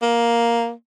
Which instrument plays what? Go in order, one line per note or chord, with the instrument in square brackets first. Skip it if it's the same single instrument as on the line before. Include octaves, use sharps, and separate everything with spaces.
[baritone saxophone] A#3